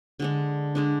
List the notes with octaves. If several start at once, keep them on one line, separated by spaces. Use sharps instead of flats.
D3 G#3 D4
D3 G#3 D4